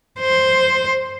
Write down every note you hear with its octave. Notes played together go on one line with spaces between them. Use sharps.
C5